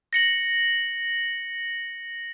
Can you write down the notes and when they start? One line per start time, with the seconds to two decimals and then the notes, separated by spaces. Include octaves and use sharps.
0.13 A#6 C#7 F#7